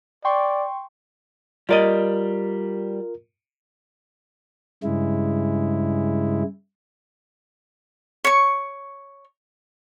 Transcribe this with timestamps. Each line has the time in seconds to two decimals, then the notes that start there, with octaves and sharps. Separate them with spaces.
0.25 D5 G5 C6 C#6
1.69 G3 F4 A#4 D5 D#5
4.84 G2 C#3 G#3 E4
8.24 C#5 C#6